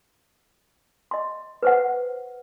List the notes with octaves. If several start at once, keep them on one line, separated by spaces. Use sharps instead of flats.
D#5 C6
B4 C5 F#5